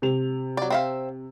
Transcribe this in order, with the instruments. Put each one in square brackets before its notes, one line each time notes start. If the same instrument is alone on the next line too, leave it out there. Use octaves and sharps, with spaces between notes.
[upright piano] C3 F7
[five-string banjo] F#3 D5
C4 E5 F5